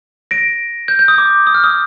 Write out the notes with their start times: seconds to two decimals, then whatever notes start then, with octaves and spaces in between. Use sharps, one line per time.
0.31 A#6 D7
0.88 G6
0.99 G6
1.08 D#6
1.18 D6
1.47 D#6
1.54 F6
1.64 D#6